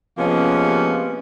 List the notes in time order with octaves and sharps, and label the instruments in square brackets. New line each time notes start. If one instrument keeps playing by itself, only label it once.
[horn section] C3 F3 G#3 A#3 B3 C#4